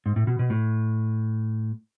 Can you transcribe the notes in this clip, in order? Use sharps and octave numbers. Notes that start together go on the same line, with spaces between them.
G#2
A2
B2
B2
A2